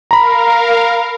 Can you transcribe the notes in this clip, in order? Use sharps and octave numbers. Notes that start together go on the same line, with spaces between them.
A#4 F5 A#5 B5